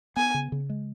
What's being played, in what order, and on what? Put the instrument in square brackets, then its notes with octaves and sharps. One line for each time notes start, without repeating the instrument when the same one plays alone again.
[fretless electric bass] B3 [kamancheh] G#5
[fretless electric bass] C#3
C#3
G#3